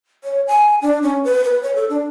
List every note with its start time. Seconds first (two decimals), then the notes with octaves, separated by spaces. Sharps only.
0.24 C#5
0.47 G#5
0.82 D4
1.02 C#4
1.24 B4
1.44 B4
1.63 C#5
1.75 A4
1.89 D4